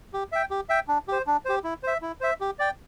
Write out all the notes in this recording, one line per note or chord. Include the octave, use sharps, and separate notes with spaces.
G4
E5 G5
G4
E5 G5
D4
G4 C5
D4
G4 C5
E4
C5 E5
E4
C5 E5
G4
D5 G5